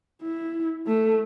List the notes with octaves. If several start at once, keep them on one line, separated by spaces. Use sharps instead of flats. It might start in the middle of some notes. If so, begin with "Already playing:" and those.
E4
A3